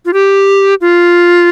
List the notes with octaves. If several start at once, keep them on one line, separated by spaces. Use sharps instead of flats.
F4
G4
F4